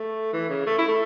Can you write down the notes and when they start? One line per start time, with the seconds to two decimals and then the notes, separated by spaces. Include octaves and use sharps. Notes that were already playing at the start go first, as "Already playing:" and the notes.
Already playing: A3
0.33 E3
0.49 C#3
0.66 A3
0.78 E4
0.88 A3